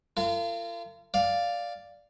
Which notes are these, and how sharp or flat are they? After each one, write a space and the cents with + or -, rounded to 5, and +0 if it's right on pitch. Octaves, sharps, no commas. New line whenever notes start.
F4 -35 A#4 -45
D5 +0 F5 +0